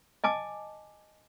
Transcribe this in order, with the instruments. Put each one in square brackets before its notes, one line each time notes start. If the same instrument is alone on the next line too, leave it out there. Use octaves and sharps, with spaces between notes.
[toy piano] D#5 G#5 A5 D6